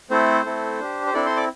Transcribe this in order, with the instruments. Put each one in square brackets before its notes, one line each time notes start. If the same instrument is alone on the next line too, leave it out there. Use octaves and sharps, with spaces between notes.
[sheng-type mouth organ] A3 C4 E4 A4 C5
A3 C4 E4 A4
D4 G4
C5
C4 D4 E4 A4 D5
C5 C6
D5 D6